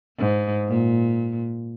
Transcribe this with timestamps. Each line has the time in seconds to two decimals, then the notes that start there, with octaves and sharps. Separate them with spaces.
0.18 G#2
0.68 A#2